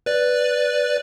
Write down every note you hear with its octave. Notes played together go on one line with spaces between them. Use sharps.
B4 D5